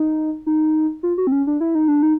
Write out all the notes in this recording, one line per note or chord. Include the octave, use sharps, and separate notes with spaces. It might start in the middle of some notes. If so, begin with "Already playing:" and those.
Already playing: D#4
D#4
F4
F#4
C4
C#4
D4
E4
D#4
D4
D#4